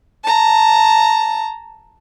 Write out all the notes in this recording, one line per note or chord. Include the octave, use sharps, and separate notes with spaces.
A5 A#5